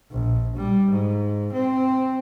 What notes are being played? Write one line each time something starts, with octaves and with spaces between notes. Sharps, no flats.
A#1
G3
G#2
C4